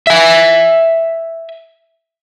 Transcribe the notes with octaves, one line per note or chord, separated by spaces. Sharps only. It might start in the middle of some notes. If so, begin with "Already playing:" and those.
E5 G#5